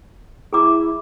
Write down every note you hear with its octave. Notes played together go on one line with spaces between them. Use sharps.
E4 G#4 A#5 D6